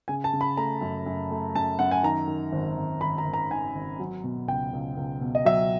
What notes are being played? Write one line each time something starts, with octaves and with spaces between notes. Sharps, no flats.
C#3 G#5
A5
C#3
B5
A3 A#5
F#2
F#2
A3
F#2 A5
F#2 F#5
G#5
D#3 A#5
D#3
G#1
G#1
G#1 B5
A#5
G#1
A#5
D#3 G#5
G#1
F#3
B2
C#2 G5
C#2
C#2
B2
D#5
F#3 E5